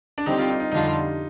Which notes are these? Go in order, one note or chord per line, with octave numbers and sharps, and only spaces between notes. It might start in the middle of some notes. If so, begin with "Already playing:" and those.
D4
D3 G3 C4 D#4 G4
F4
D#4
D#4
F2 D3 G3 D4 D#4 F4